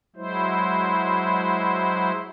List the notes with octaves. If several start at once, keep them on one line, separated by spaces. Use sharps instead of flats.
F#3 G#3 E4 C5